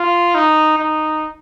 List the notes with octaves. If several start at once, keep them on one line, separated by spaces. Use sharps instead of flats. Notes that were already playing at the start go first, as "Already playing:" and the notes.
Already playing: F4
D#4
D#4